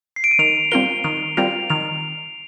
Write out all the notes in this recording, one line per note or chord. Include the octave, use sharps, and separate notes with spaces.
C7
D7
D#7
D#3 F7
G3 C4 F4 A#4 G7
D#3 F7
G3 C4 F4 A#4 F7
D#3 F7